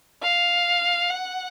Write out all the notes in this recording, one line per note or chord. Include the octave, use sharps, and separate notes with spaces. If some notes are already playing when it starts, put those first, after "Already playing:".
F5
F#5